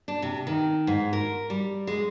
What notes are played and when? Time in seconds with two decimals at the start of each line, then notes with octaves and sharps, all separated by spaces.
0.08 D4
0.22 C3
0.47 D#3
0.87 G#2
1.13 A#4
1.50 G3
1.87 G#3